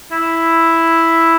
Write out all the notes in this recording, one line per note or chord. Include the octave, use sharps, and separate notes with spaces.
E4